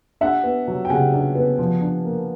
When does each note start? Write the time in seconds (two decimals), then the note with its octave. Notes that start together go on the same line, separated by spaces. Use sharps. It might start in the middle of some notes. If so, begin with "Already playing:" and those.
0.21 D4 E5 F#5
0.43 B3
0.68 F#3
0.85 G5
0.89 C#3 F#5 G#5
1.13 D4
1.35 B3
1.58 F3
1.81 D4
2.05 A#3